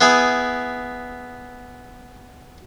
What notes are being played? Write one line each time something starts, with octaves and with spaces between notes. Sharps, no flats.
B3 E4 G#4 G#5